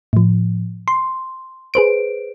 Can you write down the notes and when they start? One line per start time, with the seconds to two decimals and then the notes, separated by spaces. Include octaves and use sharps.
0.13 A2 F3
0.88 C6
1.74 G#4 B4 C5 D7